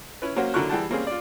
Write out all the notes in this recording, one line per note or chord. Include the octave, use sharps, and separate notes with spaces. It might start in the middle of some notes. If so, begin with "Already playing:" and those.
C#4 E4 B4
F#3 A#3 C#4 F#4 C5
D3 F#3 E4 A#4 C#6 F#6
E3 G3 G#4 F#5 G5 A5
G3 A#3 C4 C#4 G#4
F4 D5